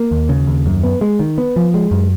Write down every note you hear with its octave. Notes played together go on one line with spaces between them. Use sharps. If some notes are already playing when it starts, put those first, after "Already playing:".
Already playing: A#3
D#2
C#3
D#2
F#2
B3
G#3
D#3
B3
F3
G#3
F#2